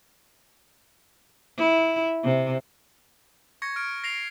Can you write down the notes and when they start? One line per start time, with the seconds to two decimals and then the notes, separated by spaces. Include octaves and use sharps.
1.58 E4
2.24 C3
3.62 C#6 G#6 A#6 C#7
3.76 F6 D7
4.04 A#6 C7 D7 F7